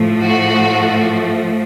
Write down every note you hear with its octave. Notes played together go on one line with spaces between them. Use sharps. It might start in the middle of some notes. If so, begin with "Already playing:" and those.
Already playing: A2 F3 A3
F#4